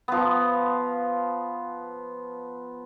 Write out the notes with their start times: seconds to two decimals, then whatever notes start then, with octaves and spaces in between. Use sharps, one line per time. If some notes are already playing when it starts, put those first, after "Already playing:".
0.08 F3 B3